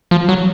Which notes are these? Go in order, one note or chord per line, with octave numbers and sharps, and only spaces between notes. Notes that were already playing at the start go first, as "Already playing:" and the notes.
F3
F#3